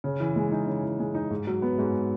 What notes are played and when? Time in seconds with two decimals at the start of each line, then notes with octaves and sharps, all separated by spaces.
0.04 C#3
0.20 E3
0.36 G#3
0.52 D#4
0.67 C#3
0.83 E3
1.00 G#3
1.15 D#4
1.30 G#2
1.47 F#3
1.62 B3
1.78 G#2